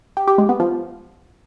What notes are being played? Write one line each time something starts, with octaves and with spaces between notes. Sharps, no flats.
G4
G4
G#3
B3
F3